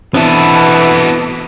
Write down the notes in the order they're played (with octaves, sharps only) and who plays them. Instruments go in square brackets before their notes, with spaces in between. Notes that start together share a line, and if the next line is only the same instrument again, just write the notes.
[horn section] B2 E3 [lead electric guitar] B3 A4 [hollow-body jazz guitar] C4 D4 E4